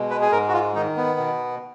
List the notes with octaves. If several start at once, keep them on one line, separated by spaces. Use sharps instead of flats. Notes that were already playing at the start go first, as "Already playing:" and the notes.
Already playing: B2 G#3
B4
G#4
G#2 A#4
F#4
F4
D#3 D#4
B3
B2